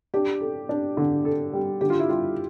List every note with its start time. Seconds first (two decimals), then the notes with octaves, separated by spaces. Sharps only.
0.14 D4 G4
0.41 A4
0.69 D4
0.97 D3
1.25 A4
1.53 G3
1.81 D3 G4
1.90 F4
1.99 E4
2.09 G3 F4